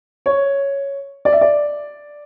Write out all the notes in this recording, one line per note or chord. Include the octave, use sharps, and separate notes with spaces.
C#5
D5
E5
D5